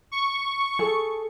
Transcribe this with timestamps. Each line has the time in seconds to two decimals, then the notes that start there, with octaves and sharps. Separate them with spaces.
0.12 C#6
0.79 G#4 A4